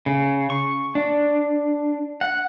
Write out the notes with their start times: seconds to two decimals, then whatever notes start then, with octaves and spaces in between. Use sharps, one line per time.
0.06 C#3
0.50 C#6
0.95 D4
2.21 F#5